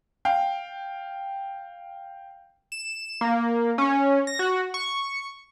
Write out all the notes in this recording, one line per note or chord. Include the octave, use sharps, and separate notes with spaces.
F5 G5
E7
A#3
C#4
A#6
F#4
C#6